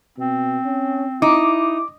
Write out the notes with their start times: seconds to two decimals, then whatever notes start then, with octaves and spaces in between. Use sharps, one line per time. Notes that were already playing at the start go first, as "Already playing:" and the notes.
0.18 B2 C4
0.65 C#4
1.22 D#4 E4 D6